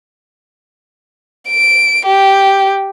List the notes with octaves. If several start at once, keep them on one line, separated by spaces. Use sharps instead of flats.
D7
G4